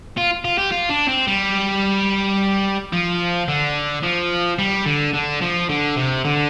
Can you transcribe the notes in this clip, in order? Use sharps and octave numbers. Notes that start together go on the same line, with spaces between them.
F4
F4
G4
F4
D4
C4
G3
F3
D3
F3
G3
D3
D3
F3
D3
C3
D3